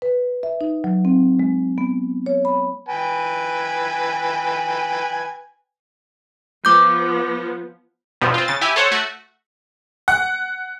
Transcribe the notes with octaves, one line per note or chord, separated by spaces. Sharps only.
B4
E5
D#4
F#3
C4
G#3
B3
C#5
B5
B4 G5 G#5
F3 B3 D6 G6
E2 G2 B2 F3
C4 F4
C#3 A6
E4 G4 E5 G#5
A4 C5 C#5 F#5
A3 F#4
F#5